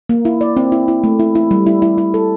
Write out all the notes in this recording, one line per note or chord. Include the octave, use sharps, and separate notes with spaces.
A#3
E4
D5
C4
E4
E4
A3
E4
E4
G3
E4
E4
E4
A4